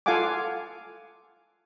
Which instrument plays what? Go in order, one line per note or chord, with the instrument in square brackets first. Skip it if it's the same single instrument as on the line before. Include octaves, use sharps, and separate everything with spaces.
[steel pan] F4 A4 F5 F#5 G#5 D6